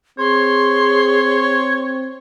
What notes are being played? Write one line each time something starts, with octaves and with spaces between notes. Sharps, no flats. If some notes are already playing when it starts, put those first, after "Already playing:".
C4 G#4 C#5 C6